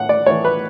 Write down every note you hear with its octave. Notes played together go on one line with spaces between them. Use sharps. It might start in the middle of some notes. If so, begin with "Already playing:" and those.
Already playing: A2 F#5
D5
E3 A3 C#5
B4